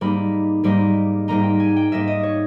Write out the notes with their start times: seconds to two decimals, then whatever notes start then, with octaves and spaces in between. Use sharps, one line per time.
0.01 G#2 G3 A#3 D#4 B5
0.64 G#2 G3 A#3 D#4
1.28 G#2 G3 A#3 D#4 A#5
1.43 G5
1.60 G#5
1.76 G5
1.92 G#2 G3 A#3 D#4 E5
2.07 D#5
2.23 C#5